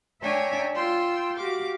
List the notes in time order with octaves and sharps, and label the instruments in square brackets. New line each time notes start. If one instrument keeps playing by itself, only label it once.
[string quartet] D4 C#5 E5 G5 G#5 A#5
F4 G5 C6 E6
F#4 G4 F5 D6